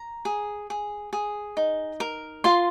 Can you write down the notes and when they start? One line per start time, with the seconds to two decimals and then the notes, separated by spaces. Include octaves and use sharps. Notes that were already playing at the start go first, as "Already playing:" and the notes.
Already playing: A#5
0.25 G#4
0.70 G#4
1.13 G#4
1.57 D#4
2.00 A#4
2.44 F4 C6